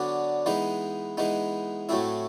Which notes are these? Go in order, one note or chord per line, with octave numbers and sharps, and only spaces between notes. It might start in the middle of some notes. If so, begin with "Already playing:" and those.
Already playing: D3 F#3 B3 D4
E3 G#3 B3 D#4
E3 G#3 B3 D#4
A2 F#3 A3 C4 E4